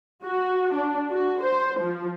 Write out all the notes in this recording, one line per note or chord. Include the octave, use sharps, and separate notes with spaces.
F#4
D4
F#4
C5
F3